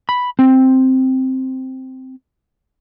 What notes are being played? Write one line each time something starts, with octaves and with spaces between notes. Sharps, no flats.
B5
C4